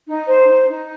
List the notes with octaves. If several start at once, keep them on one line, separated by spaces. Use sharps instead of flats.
D#4
C5
D#4
D#4